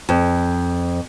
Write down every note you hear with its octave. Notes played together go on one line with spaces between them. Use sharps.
F2